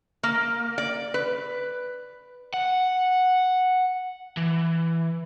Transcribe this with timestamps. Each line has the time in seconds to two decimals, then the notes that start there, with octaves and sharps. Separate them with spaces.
0.23 A#3
0.78 D5
1.14 B4
2.54 F#5
4.37 E3